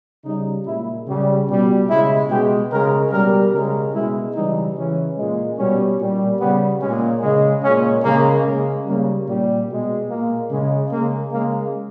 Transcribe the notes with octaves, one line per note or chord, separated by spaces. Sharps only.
C#3 G3 D#4
A#2 G#3 E4
C#3 G3
B2 G3
C#3 G#3 E4
B2 G#3 G4
C#3 G#3 A#4
B2 G3 A#4
C#3 G#3 A#4
B2 G#3 E4
C#3 E3 G3 D#4
C#3 E3 G#3 C#4
A#2 G#3
B2 G3 C#4
A#2 G3
C#3 G3 B3
G#3 C#4
A#2
C#3 G#3
A#2 G#3 C#4
C#3 G#3 A#3
C#3 G#3 A#3
C#3 G3 A#3
A#2 G3
B2 G#3
A#2 G#3 A#3
C#3 G#3
C#3 G#3 A#3
C#3 G#3 A#3